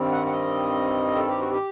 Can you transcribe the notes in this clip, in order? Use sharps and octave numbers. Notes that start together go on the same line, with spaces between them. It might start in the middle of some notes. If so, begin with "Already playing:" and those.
Already playing: G2 D#3 G3 C4
F#5
F#5
D#5
A4
G4
F#4
G4